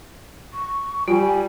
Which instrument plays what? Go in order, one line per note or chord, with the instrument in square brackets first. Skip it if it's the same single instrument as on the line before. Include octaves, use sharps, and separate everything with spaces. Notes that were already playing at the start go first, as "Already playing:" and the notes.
[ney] C#6
[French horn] G3 [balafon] F4 [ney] G#5